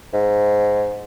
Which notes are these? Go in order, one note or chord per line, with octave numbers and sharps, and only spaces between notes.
G#2